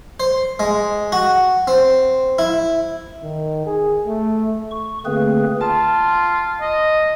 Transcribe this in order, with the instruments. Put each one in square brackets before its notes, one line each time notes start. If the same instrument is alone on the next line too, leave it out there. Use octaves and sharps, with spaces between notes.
[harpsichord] C5
G#3
F#4
C4
E4
[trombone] D#3
G#4
A3
[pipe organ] C#6
D3 A3 A#3 C4 G#4 B4
[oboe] F4 [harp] A5
[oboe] D#5